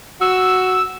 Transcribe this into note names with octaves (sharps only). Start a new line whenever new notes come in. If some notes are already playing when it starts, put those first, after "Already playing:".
F#4 E6